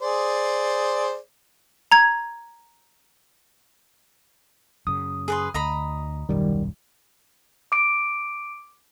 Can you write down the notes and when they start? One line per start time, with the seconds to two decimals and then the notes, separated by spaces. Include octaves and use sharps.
0.01 G#4 C5 D5
1.91 A#5 G#6
4.87 F#2 C#3 D#6
5.28 G#4 B4 C6
5.54 D2 D#5 A#5 B5
6.29 D#1 B1 F#2 D#3 G3
7.72 D6 D7